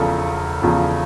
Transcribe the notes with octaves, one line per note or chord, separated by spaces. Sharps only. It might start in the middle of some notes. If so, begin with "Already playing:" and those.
Already playing: E1 E2 C#3 F3 A4
E1 E2 C#3 F3